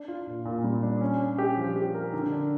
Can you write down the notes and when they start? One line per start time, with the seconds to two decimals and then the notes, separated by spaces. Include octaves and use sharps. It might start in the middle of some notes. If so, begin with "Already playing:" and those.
Already playing: D4
0.08 F4
0.27 A#2
0.45 A#2
0.64 G3
0.83 D4
1.01 C#4
1.20 C#4
1.38 G4
1.58 F3
1.76 G4
1.94 A#4
2.13 D3
2.32 D4